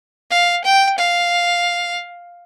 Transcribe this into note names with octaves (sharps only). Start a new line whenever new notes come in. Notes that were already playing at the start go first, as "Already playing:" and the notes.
F5
G5
F5